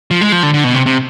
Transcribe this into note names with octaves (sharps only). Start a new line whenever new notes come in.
F3
G#3
F3
D3
D3
B2
C3
C3